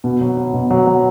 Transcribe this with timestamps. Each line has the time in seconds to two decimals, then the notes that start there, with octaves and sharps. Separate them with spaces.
0.04 B2
0.21 F#3
0.37 F#3
0.54 B2
0.70 F#3
0.87 F#3